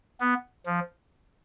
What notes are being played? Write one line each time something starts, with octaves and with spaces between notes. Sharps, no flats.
B3
F3